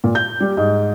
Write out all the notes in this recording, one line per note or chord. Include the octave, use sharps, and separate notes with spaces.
A#2
G6
G3
G#2